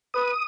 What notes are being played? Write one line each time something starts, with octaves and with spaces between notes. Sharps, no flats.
B4 D#6